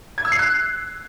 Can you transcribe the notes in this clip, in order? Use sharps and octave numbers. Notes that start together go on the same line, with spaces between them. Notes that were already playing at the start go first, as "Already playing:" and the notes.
G#6
E6
C7
F#6